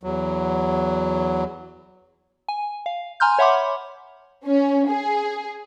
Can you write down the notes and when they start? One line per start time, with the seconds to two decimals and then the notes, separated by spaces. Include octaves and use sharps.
0.03 E2 F#3
2.48 G#5
2.86 F5
3.20 G#5 A#5 C6 F6 G6
3.39 C#5 E5 F#5 B5 C6 D6
4.46 C#4
4.88 G#4